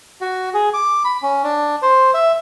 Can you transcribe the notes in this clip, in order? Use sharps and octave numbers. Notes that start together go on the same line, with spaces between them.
F#4
G#4
D6
B5
C#4
D4
C5
E5